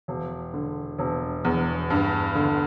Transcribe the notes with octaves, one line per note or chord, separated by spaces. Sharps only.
E1
D3
E1
E2
G2
D3